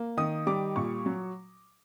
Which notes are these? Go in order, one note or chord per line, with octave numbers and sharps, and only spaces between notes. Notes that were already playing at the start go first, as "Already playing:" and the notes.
Already playing: A#3
D#3 D#6
G3 D6
A#2 C#6
F#3